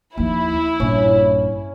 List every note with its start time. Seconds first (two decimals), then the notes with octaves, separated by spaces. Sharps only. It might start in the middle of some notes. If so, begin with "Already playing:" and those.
0.18 D#2 F3 E4
0.80 A#1 G2 C#4